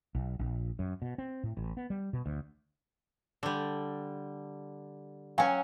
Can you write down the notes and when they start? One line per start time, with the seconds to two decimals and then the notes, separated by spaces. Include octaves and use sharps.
0.15 B1
0.39 A#1
0.79 F#2
1.02 B2
1.18 C4
1.43 A2
1.57 A1
1.77 B3
1.90 G3
2.13 B2
2.26 D2
3.43 D3 G3
5.38 F#3 C#4 F5 G5 G#5